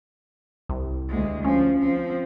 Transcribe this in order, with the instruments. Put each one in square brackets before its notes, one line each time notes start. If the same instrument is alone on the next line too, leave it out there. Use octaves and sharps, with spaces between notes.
[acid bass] C2
[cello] D2 G#3
[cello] F3 [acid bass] C#4
[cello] F3 C4